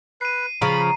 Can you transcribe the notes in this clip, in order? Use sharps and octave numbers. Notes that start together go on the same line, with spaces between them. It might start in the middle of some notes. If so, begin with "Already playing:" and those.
B4 C7 D#7
C#3 F3 A#5 B5